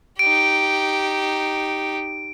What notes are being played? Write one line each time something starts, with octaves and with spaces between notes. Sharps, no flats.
D#4 G4 D7